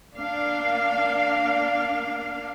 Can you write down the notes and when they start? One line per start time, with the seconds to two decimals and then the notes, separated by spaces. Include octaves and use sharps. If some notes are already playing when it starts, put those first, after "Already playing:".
0.14 A#3 D4 F5